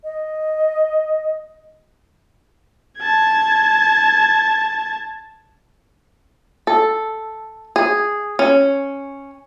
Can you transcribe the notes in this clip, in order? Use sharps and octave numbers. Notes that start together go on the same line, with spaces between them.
D#5
A5 G#6
A4
G#4
C#4